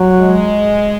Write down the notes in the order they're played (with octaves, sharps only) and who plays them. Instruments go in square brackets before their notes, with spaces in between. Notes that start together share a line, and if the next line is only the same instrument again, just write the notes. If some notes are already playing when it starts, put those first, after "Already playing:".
Already playing: [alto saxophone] F#3
[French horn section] G#3